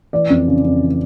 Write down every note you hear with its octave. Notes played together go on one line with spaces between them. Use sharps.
E3 D5
F2
C#3
F2
E3